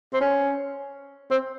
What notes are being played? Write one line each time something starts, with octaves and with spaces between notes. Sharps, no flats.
C4
C#4
C4